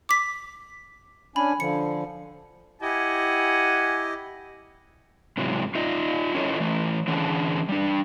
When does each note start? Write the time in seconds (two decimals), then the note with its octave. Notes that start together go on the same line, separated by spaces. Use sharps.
0.09 D6 B6
1.36 C#4 D4 G#5 B5
1.60 D3 F3 C#7
2.81 E4 G4 D#5 F#5 G#5
5.37 G#2 C3 E3 F#3 G#3
5.75 D#4 F4 D#5
6.34 C#4 E4 F4 A4 C#5 D#5
6.60 E3 A3
7.08 D3 E3 C#4 G#4 F#5 A5
7.69 G3 D4